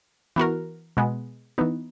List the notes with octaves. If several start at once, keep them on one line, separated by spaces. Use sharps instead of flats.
E3 B3 F#4 A#4
B2 G#3 B3
E3 B3 D#4